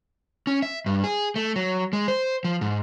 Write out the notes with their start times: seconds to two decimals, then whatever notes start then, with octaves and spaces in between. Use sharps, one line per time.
0.47 C#4
0.62 E5
0.86 G2
1.04 G#4
1.36 A3
1.56 F#3
1.93 G#3
2.08 C5
2.44 F3
2.61 G#2